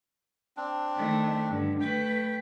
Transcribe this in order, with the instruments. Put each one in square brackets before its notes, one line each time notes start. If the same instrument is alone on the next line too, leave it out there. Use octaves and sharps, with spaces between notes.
[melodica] C4 D4
[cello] D#3 A3
G2 D3
[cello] A3 B4 [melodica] G5